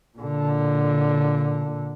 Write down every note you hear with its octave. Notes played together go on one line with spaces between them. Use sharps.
A#2 D3